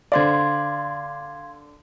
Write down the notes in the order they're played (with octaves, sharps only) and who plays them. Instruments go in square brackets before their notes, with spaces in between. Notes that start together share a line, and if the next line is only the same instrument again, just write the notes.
[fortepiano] D3 C5 D5 [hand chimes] F5 C6 G#6